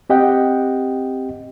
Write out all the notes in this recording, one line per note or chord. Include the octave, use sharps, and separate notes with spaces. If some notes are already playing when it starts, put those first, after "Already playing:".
C4 G4 D#5 F#5 G5